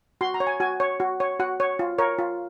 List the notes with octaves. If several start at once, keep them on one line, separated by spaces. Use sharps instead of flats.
F#4 C6
A#5
C#5
G#5
F#4 G#5
C#5
F#4
C#5
F#4 F#5
C#5
F4
A#4 C#5
F4